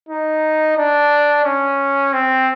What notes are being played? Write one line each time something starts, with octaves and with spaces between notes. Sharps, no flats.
D#4
D4
C#4
C4